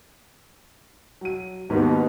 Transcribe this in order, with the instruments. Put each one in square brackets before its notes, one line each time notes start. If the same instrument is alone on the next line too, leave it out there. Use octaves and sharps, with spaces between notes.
[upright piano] F#3 D#7
[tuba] D#2 [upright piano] G#2 B3 D#4 [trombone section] B2